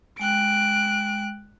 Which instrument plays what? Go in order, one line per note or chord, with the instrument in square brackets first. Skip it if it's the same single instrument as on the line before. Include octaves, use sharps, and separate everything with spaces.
[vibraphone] G#3 G5 [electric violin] F#6 D7